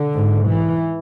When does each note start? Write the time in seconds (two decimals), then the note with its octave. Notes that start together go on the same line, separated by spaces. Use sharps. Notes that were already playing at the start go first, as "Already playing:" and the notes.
Already playing: D3
0.14 G#2
0.47 E3